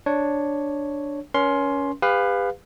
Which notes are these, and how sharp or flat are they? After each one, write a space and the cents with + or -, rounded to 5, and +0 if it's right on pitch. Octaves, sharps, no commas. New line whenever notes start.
D4 +0 C#5 +0
C#4 +20 A#4 +45 C6 +5
G4 +45 B4 +15 F5 +15